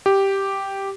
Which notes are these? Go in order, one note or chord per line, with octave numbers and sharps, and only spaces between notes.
G4